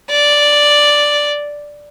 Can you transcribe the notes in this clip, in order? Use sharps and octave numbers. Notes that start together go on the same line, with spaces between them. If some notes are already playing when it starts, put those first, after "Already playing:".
D5